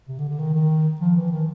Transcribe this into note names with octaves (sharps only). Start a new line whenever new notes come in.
C3
D3
D3
D#3
D#3
F3
E3
D#3